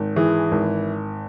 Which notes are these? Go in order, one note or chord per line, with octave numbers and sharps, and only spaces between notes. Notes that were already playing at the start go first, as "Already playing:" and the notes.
Already playing: G#1
E3 G#4
G#1